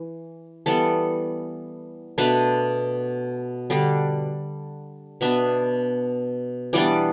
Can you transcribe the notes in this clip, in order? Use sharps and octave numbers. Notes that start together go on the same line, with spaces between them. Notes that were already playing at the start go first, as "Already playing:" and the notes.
Already playing: E3
E3 G3 B3 A4
B2 A3 D4 B4
D3 G3 D4
B2 B3 D4 E5
E3 G3 B3 D4 D5